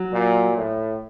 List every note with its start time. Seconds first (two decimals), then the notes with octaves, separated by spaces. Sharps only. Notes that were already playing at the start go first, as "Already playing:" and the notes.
Already playing: F#3
0.13 A#2
0.57 A2